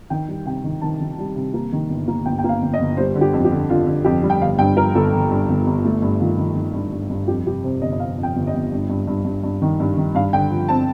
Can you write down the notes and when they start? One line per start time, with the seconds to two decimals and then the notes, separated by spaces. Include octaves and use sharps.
0.10 D#3 G5
0.28 G3
0.46 C3 G5
0.64 D#3
0.81 D#3 A5
1.00 D#3
1.18 G3
1.36 C3
1.54 A#3
1.72 D#3
1.90 G1
2.08 A#3
2.26 G1 G5
2.39 G5
2.44 A#3 F5
2.62 G1
2.74 D#5
2.79 G1
2.97 G3 C5
3.15 D3
3.21 G4
3.33 F2
3.45 G4
3.51 D3
3.70 D3 F4
3.87 D3
4.04 F2 G4
4.23 G3
4.30 G5
4.42 G1 F5
4.59 G2 G5
4.77 F3 A#4
4.95 G1 A4
5.13 G1
5.31 G2
5.49 G1
5.67 G1
5.85 A3
6.02 G2
6.20 D#3 F4
6.38 D#3
6.56 D#3
6.74 G2
6.92 G2
7.10 G2
7.28 F2 G4
7.45 C3 G4
7.64 C3 C5
7.82 G1 D#5
7.92 D#5
8.00 F2 F5
8.18 F2
8.23 G5
8.36 G1
8.47 D#5
8.54 G1
8.72 G2
8.90 G2
9.07 G2
9.25 G2
9.43 G2
9.62 D#3
9.80 G2
9.97 D#3
10.15 G2 F5
10.33 D3 G5
10.51 F3
10.69 C4 A5